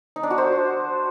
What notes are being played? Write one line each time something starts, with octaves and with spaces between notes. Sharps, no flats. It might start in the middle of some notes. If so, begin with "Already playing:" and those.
D#4
D4
F#4
C5